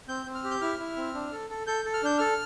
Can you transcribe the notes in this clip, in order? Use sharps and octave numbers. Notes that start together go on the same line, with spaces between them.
C4 G6
C4
F6
G4
G6
E4 F6
E4
C4
D4
A4
A4
A4 G6
A4
F6
D4 G6
A4 F6